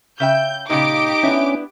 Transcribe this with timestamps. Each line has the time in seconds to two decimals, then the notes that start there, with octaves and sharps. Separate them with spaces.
0.20 C#3 E5 G5 G6
0.70 A#2 C#3 D#4 G4 D6 D7
1.23 B3 C#4 D4 E4